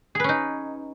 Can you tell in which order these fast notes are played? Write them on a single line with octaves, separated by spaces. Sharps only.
G#4 B4 C#4 D#4